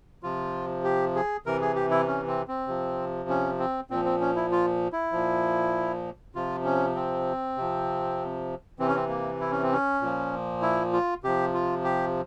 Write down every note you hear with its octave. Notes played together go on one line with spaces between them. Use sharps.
C3 F3 F4
G4
G#4
C3 E3 A#4
G#4
G4
E4
C#4
C4
C4
C3 F3
C#4
C4
A#2 F3 C4
C4
C#4
E4
F4
E4
A#2 F3
C3 F3 F4
C#4
C4
C3 F3
C3 E3 C4
C#4
C4
A#3
E4
C#4
C4
C#4
A#2 F3
E4
F4
C3 F3 G4
F4
G4